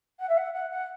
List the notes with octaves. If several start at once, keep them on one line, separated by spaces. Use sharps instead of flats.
F#5
E5
F#5
F#5
F#5